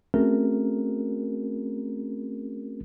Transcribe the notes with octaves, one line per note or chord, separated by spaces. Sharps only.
A3 C4 C#4 F#4 G#4 A#4